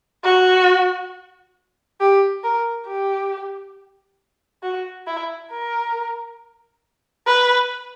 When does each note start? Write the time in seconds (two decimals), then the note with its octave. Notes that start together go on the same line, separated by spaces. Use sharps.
0.24 F#4
2.00 G4
2.44 A#4
2.88 G4
4.63 F#4
5.07 E4
5.51 A#4
7.27 B4